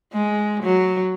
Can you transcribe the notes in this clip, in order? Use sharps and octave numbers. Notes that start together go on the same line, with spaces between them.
G#3
F#3